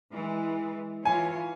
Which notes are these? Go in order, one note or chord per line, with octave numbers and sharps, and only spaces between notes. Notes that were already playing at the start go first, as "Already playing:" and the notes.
E3 G#3
E3 F4 C#5 G#5